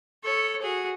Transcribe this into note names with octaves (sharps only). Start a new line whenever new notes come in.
A4 C#5
F#4 G#4